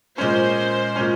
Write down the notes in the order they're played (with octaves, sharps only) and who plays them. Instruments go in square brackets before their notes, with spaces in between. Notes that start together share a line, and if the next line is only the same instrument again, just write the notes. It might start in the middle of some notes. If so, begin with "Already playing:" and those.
[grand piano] A#2 G#3 C#4 [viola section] C5
[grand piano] A#2 G#3 C#4